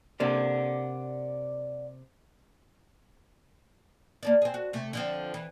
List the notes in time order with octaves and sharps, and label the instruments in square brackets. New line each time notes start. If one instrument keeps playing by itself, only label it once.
[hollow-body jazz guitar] C3 A#3 D4 [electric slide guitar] D5 F#5
[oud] A#3 A4 D5
C4 G#4
F#4
C3 A3
D3 F3 C4
E3